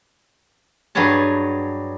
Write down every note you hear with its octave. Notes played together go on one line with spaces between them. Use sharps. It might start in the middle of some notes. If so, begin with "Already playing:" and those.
G2 F#3 G#4 B4 C#5 A5